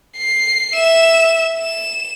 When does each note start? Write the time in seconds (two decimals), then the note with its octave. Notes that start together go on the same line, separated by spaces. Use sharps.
0.17 C7
0.75 E5 E7
1.58 E7